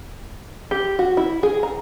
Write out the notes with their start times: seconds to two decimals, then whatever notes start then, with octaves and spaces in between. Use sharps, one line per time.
0.71 G4
0.99 F#4
1.17 E4
1.43 G#4
1.63 A#5